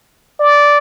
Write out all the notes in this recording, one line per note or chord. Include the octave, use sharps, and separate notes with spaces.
D5